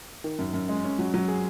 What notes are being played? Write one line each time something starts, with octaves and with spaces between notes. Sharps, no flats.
D#3
F#2
F#2
G#3
C#4
F#3
F#3
G#4